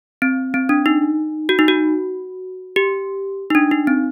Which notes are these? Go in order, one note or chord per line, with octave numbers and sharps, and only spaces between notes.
C4
C4
D4
D#4
F#4
D#4
F#4
G4
D#4
D4
D#4
C4